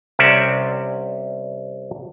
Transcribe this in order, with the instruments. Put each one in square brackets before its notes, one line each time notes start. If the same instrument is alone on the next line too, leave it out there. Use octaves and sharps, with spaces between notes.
[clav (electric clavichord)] C2 C3 C4 C#4 D5 E5